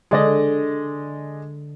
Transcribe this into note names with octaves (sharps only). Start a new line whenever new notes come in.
D3 G#3 D5 D#5